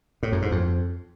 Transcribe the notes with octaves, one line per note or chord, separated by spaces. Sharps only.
A2
F#2
G#2
F2